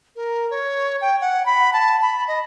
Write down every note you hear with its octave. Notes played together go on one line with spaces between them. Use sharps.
A#4
C#5
G5
F#5
B5
A5
B5
D#5